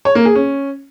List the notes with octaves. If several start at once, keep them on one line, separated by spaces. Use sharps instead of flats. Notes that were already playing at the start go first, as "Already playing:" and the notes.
C#5
A#3
G#4
C#4